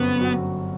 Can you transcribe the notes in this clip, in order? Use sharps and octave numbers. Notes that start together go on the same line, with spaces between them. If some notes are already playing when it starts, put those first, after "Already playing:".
Already playing: G1 F#2 F#3 B3 C4 F#4
F#3 C4 F#4